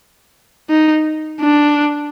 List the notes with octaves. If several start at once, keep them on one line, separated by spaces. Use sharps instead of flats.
D#4
D4